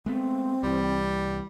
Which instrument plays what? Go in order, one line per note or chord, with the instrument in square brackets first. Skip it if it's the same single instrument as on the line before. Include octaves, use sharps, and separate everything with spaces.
[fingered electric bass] G#3 A3 B3 [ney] C4
[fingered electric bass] C2 E3 [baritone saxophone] G3